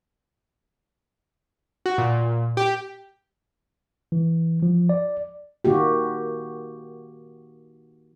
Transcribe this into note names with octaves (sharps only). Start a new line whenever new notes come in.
F#4
A#2
G4
E3
F3
D5
D#3 A#3 F#4 G4